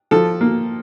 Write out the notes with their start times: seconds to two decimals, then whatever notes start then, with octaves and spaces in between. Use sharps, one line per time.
0.11 F3 A4
0.41 A#3